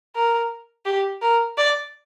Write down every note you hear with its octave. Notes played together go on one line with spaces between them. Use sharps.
A#4
G4
A#4
D5